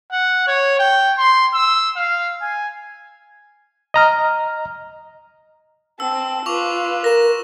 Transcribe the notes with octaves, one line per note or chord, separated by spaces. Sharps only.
F#5
C#5
G5
C6
E6
F5
G#5
D#5 A#5 F6
C4 A5 E6
F4 B4 C#6 D6 F7
A#4 A#6 E7